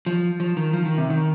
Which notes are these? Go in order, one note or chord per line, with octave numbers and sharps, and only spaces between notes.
F3
F3
D#3
F3
D#3
C3
D#3